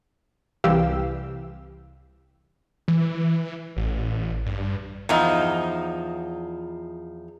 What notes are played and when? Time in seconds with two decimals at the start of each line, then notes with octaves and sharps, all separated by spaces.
0.64 C2 C3 E3 G4 F5 E6
2.88 E3
3.77 A1
4.46 G2
5.09 E2 F3 D#4